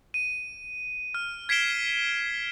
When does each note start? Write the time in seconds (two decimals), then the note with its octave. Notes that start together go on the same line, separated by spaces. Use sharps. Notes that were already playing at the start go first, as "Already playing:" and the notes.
0.14 D#7
1.14 F6
1.49 G#6 B6 C7 D7 E7 G7